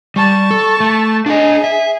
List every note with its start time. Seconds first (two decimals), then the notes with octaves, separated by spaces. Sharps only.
0.16 G3 A5 C#6
0.51 A4
0.80 A3
1.26 D4 G#4 D#5
1.64 E5